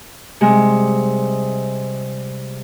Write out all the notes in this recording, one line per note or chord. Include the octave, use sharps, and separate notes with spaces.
C3 G3 G#3